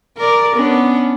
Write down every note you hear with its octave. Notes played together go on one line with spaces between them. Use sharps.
A#4 D5
B3 C#4 D4